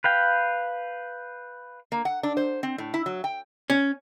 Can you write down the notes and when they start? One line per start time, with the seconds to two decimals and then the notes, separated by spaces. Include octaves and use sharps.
0.04 B4 F5 G5
1.92 A#3
2.05 F#5
2.23 D4
2.37 C5
2.63 C4
2.78 A2
2.94 E4
3.06 F#3
3.24 G5
3.70 C#4